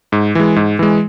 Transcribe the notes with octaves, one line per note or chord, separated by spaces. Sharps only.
G#2
E3 G#3
G#2
E3 G#3